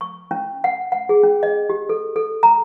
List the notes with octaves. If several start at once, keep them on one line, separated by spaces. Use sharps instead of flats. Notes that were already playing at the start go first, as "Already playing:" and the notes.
C#6
C#4
F#5
F#5
G#4
C#4
D#5
G4
A4
A4
A#5